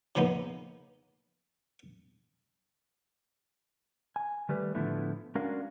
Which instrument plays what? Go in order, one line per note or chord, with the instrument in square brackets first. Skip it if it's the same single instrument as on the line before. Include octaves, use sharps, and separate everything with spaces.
[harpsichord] C#3 F3 A#3 B3 D#4
[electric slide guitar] G#5
D#3 G3 A3 B4
A2 D3 F3 A3 B3 E4
G#3 C#4 D4 F#4 A#4 F5